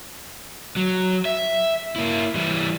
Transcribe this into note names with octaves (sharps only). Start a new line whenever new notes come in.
F#3
E5
A#3 E4
E3 G3